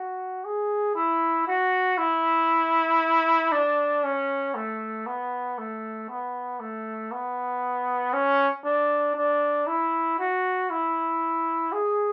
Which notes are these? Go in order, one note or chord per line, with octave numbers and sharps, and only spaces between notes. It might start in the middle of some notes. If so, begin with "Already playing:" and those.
Already playing: F#4
G#4
E4
F#4
E4
D4
C#4
A3
B3
A3
B3
A3
B3
C#4
D4
D4
E4
F#4
E4
G#4